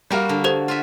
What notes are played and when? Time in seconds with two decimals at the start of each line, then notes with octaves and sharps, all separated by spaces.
0.10 G3 A#3 F#4 A#4 F5
0.29 D3
0.44 G4 A4 C5 G#6
0.68 F4 F#4 E5